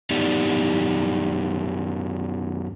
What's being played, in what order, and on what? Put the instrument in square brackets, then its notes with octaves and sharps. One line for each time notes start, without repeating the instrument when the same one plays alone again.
[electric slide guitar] F#2 B3 D#4 G4 D5